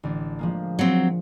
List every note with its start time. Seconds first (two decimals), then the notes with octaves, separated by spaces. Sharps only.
0.03 A1 D3 D4
0.39 F3 G#3 A#3
0.79 F#3 C4